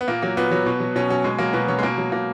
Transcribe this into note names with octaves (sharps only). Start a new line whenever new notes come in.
B3
A#2 A#3
F#3 A#3
A#2 B3
F#3
B2
F#3
B2 C#4
F#3 C#4
B2 G#3
F#3 A#3
B2 B3
F#3 C#4
G#3
B2 A#3
F#3
B2 A#3